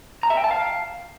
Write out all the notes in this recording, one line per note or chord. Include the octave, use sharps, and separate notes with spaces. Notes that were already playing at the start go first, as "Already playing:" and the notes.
A#5
E5
G5
A5
F5